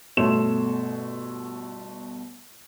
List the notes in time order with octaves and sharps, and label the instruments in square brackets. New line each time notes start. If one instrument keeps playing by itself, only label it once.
[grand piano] G1 B2 A3 C#5 C6 E7